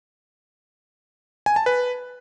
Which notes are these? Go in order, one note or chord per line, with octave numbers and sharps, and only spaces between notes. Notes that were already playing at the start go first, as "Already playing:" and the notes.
G#5
A5
B4